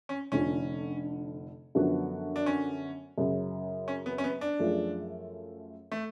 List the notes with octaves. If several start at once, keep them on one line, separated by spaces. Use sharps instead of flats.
C#4
F1 F2 D3 F3 C#4
F#2 D3 F3 B3 F#4
D4
C#4
F#2 C#3 F#3
C#4
B3
C#4
B3
D4
F#2 F3 A3 F4 G#4
A3